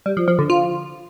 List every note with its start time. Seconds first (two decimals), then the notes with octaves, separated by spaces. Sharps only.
0.06 G3
0.17 F3
0.28 F3
0.39 D3
0.50 F4